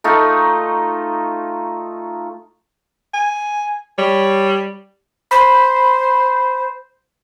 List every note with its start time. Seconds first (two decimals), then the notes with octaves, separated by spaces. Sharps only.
0.04 A3 D#4 F4
3.14 G#5
3.98 G3 C#5
5.31 C5 B5